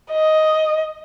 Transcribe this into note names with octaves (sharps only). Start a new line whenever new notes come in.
D#5